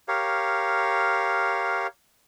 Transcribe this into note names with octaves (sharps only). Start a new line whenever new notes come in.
G4 A#4 C#5 F5